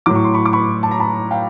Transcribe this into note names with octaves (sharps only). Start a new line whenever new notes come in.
A2 F#3 D6
C#6
C6
B5 C#6
D6
B5 C#6
A5
A#5
A5 B5
F5 G5